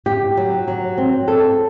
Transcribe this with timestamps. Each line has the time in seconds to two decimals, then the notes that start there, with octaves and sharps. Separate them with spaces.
0.06 G4
0.37 F#3
0.68 F#3
0.98 C4
1.28 A4